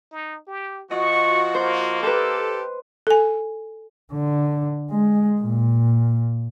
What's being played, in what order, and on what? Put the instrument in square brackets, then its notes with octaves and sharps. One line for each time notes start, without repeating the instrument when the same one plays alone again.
[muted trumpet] D#4
G4
[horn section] F3 F4 F#4 [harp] D#5 [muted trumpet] C#6
[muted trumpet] A#3 [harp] C5
[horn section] G4 A4 [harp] B4 C5
[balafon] A4 G#5
[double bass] D3
G#3
A#2